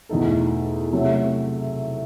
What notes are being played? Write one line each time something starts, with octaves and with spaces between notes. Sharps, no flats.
E2 B2 A3 D#4 A4
C3 F#3 A3